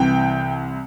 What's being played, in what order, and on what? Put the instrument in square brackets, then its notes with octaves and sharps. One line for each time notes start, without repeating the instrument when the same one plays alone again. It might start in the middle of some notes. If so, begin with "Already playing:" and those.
Already playing: [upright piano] C2 C3 E3 G5